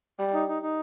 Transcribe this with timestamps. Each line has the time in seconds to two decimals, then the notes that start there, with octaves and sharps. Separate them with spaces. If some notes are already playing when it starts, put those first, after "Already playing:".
0.19 G3
0.34 D#4
0.48 D#4
0.62 D#4